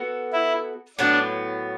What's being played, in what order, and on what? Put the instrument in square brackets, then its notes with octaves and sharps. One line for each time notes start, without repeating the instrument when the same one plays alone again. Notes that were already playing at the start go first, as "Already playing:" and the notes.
Already playing: [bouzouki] B3 F#4 A4
[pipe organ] E4
[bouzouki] A2 F#3 B3 [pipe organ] D4